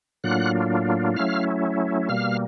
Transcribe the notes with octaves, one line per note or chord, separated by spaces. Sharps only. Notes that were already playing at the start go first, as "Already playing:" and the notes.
A2 F#3 A#3 D4 F4 F#5 F#6
F#3 A3 C#4 E4 F5 F6
B2 G3 A#3 F5 F6